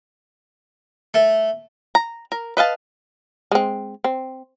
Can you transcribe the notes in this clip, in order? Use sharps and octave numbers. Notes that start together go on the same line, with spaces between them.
A3
A#5
A#4
B4 D#5 F5 A5
G#3 C4
C4